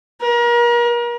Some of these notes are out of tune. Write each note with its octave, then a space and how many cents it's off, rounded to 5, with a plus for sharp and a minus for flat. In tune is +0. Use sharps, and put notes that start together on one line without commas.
A#4 +35